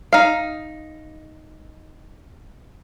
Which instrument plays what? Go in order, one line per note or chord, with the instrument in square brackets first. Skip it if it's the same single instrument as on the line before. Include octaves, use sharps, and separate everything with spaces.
[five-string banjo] D#4 F5